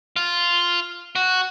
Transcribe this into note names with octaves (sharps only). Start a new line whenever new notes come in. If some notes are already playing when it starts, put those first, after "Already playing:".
F4
F#4